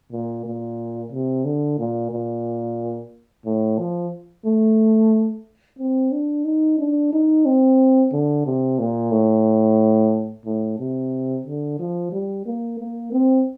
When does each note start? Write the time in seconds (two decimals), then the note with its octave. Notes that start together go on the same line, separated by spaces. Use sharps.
0.12 A#2
0.45 A#2
1.12 C3
1.45 D3
1.79 A#2
2.11 A#2
3.46 A2
3.79 F3
4.45 A3
5.79 C4
6.12 D4
6.45 D#4
6.79 D4
7.13 D#4
7.46 C4
8.12 D3
8.46 C3
8.79 A#2
9.12 A2
10.45 A2
10.79 C3
11.46 D3
11.79 F3
12.12 G3
12.46 A#3
12.79 A#3
13.12 C4